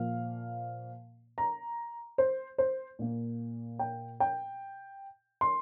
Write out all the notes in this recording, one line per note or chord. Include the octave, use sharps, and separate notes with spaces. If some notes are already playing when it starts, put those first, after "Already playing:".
Already playing: A#2 F3 A#3 F5
A#5
C5
C5
A#2 A#3
G5
G5
C6